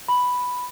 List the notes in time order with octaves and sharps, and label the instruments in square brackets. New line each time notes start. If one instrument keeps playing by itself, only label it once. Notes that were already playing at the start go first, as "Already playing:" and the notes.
[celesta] B5